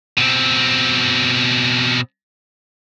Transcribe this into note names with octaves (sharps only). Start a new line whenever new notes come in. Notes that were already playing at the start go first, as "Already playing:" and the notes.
B2 C4